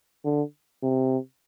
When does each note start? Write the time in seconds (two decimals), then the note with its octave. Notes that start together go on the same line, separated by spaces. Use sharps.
0.25 D3
0.83 C3